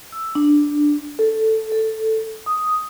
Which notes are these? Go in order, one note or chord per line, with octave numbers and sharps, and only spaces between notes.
E6
D4
A4
A4
D#6